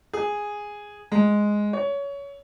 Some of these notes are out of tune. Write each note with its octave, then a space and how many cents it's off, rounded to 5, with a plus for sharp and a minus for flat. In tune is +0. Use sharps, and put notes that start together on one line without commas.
G#4 -5
G#3 +0
C#5 +20